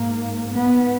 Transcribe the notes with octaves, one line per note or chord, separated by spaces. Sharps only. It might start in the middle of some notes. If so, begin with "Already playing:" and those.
Already playing: G#2 A#3
B3